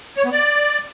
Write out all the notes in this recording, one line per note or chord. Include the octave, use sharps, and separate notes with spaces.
C#5
B3
D5